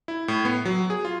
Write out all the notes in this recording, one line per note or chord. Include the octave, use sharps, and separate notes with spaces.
E4
A2
B3
F#3
G#4
F4